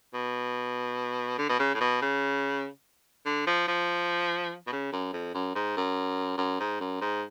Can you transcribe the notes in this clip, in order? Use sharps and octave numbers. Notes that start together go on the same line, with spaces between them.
B2
D3
B2
C#3
A2
B2
C#3
D3
F3
F3
B2
C#3
F#2
F2
F#2
G#2
F#2
F#2
G#2
F#2
G#2